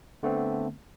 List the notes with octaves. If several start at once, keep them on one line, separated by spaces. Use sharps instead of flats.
D3 A3 B3 C4